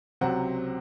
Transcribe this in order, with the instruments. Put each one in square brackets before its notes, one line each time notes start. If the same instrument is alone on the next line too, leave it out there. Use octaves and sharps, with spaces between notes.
[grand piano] C#2 C3 F#3 C4 F#5